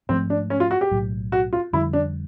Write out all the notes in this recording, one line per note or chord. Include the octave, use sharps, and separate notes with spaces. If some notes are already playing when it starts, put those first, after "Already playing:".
G#2 F3 A3 C4
D4
C#4
F4
F#4
G4
B1 A2 F#3
F#4
F4
F2 D3 G3 E4
D4